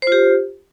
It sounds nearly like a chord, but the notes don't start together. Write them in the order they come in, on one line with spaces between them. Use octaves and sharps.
C5 F4 G4